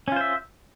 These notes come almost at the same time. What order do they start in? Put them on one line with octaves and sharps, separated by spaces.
C#4 F4 C5 E5